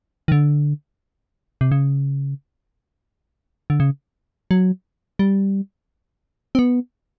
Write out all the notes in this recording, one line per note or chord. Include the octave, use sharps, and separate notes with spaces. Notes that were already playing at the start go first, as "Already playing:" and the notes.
D#3
D3
C3
C#3
D3
C#3
F#3
G3
C4
B3